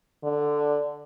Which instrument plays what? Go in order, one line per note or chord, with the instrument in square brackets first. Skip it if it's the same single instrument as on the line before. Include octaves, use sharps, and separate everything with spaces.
[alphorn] D3